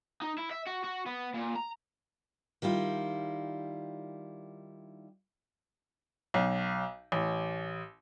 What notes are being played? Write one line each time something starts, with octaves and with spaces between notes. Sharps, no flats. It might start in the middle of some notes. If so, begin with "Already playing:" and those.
D#4
E4
E5
F#4
F#4
B3
A#2
A#5
D#3 G3 E4 F4
B1
A1